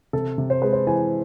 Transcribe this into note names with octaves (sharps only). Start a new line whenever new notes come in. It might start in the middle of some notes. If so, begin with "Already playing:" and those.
C3 A4
C3
C5
G#3 B4
C5
E3 G#5